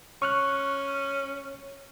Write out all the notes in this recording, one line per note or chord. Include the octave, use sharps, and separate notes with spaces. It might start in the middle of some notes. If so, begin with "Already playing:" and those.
C#4 C#6 F6 F#6